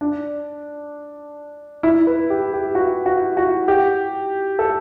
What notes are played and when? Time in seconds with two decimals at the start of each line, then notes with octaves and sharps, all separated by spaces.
0.01 D4
1.83 E4
2.07 B4
2.30 G4
2.53 G4
2.75 F#4
3.06 F#4
3.37 F#4
3.68 G4
4.59 A4